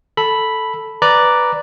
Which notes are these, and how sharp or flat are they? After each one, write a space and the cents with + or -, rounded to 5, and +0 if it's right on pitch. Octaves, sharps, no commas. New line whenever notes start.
A4 +0 B5 +0
B4 +0 D5 +0 A#5 +0